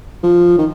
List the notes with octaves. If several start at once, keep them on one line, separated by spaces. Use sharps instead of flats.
F3
D#3